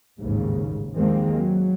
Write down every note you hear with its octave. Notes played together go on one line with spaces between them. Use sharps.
A1 D#2 G#2 C#3
D#2 D#3 F3 G#3 A#3 C4
F#3